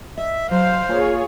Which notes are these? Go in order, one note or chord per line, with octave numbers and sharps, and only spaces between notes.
D#5 E5
F#3 C5 F5
A#3 F4 G#4 C#5